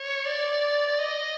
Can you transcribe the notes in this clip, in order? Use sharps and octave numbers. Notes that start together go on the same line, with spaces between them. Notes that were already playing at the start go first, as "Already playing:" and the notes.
Already playing: C#5
D5
D#5